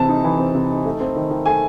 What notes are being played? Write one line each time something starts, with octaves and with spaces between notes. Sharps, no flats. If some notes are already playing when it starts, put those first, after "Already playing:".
Already playing: C3 E3 C4 A5
D#4
E3
C4
C3
D#4
A3
C4
D#3
D#3
A3 G#5